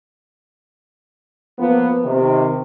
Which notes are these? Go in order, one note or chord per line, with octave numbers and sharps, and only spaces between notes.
F3 A#3 B3
C3 D#3